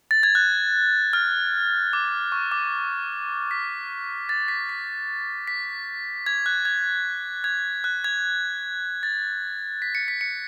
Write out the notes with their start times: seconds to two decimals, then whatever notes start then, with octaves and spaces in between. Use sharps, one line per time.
0.11 A6
0.23 G#6
0.35 F#6
1.13 F6
1.93 D6
2.32 C#6
2.52 D6
3.51 B6
4.29 A6
4.48 B6
4.69 B6
5.47 B6
6.26 G#6
6.46 F#6
6.65 G#6
7.44 G#6
7.84 F#6
8.04 G#6
9.03 A6
9.82 B6
9.95 C#7
10.08 B6
10.21 C#7